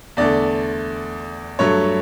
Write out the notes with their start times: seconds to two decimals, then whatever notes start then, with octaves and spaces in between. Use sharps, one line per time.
0.17 E2 D3 A3 D5
1.59 G2 F#3 A3 C#5